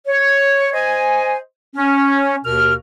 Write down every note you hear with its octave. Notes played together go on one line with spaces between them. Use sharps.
C#5
C5 D#5 G#5
C#4
D#2 B2 A#4 F6